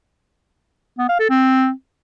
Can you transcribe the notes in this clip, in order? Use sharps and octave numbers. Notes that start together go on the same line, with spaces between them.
B3
F5
A4
C4